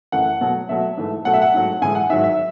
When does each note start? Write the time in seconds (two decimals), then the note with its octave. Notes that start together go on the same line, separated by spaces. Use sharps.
0.12 F#2 E3 A3 F#5
0.41 B2 F#3 A3
0.69 B2 F#3 A3 E5
0.97 G#2 E3 A3
1.25 B2 F#3 A3 F#5
1.33 E5
1.42 F#5
1.54 G#2 F#3 A3
1.82 A2 E3 G#3 G#5
1.95 F#5
2.10 G#2 D#3 F#3 E5
2.24 E5